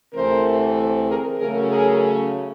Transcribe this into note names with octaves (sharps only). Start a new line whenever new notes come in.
D2 C3 E3 A3 C4 A#4 C5
G#4 A#4
C#3 F#3 A3 C#4 G#4 A#4
G#4 A#4